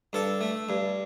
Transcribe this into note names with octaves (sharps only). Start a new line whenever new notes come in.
G2 A4
A3
G2